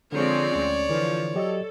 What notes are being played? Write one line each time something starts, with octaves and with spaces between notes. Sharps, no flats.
D3 F3 G#3 C4 C#5 D5
D2 C#4
D3 E3 F3
F#3 G4 A4 D#5